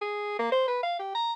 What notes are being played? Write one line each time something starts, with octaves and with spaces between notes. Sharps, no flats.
G#4
A#3
C5
B4
F5
G4
A#5